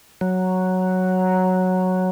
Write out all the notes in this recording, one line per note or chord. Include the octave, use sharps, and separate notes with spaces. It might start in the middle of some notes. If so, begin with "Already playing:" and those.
F#3